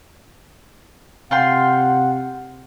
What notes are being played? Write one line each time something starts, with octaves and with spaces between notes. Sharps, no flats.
C3 F4 F#5 G5 C6